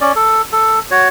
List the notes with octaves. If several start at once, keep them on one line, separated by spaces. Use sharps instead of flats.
C#4 D5
A4
A4
F#4 C#5